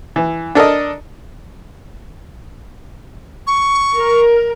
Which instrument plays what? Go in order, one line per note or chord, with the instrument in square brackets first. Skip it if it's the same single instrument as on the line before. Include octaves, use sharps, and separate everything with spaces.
[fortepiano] E3
D4 A4 A#4 D#5
[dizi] C#6
[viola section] A#4